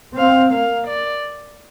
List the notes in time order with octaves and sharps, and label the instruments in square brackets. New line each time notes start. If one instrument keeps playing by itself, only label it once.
[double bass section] C4 [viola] F5
[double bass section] A#3 [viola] F5
[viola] D5